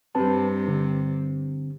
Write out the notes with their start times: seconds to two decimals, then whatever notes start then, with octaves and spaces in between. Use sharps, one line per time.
0.15 G2 C3 C4 B4 A5
0.68 D3 C4